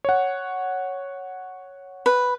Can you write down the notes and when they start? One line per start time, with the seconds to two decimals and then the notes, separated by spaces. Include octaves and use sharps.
0.05 C#5 F#5
2.06 B4